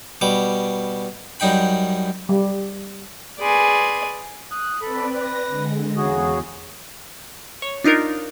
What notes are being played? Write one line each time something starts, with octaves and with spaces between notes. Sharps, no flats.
B2 G3 D6
F#2 G3 D#4 G5 B5
G3
G#4 B4 D5 G#5 C6
D#6 F#6
C4 A4 B4 D5 B5
B4 A#6
D3 G#3
E2 C#3 F#4 G#4
C#5
D4 D#4 F4 A#4